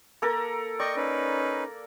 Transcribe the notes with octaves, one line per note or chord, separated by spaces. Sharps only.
A#3 A4 A#4
D5 D#5 G5 C#6
C#4 D#4 B4